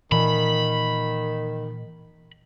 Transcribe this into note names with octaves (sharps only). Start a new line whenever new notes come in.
A#2 D#3 E3 B5